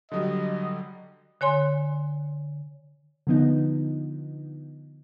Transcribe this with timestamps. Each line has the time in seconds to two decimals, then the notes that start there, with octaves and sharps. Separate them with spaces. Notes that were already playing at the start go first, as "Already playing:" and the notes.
0.12 D3 F#3 G3 D#5
1.41 D3 C#5 G#5 C6
3.27 D3 F3 B3 D#4